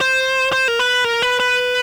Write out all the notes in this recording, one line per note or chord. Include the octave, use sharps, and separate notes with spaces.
C5
C5
A#4
B4
A#4
B4
B4